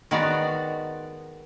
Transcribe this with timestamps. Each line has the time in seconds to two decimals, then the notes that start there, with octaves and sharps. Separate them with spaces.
0.11 D#3 G#3 B3 F#4 D5 A#5